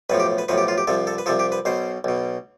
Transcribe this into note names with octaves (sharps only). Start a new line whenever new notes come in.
B1 A2 F3 B4
G4
B4
B1 A2 F3 B4
G4
F4
G4
C2 C3 F3 A4
A4
B4
C2 C3 F3 A4
G4
B4
B1 B2 C5
B1 B2